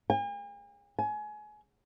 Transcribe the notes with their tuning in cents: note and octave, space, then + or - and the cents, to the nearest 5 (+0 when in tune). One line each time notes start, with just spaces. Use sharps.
G#5 -45
G#5 +25